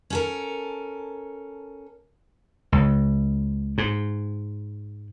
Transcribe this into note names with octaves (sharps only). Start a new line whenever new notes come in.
C#4 A4 A#4
C#2
G#2